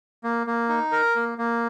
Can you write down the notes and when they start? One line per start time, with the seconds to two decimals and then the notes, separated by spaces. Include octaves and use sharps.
0.24 A#3
0.47 A#3
0.69 D#4
0.92 A#4
1.16 A#3
1.38 A#3